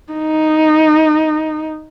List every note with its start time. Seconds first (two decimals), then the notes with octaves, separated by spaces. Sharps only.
0.13 D#4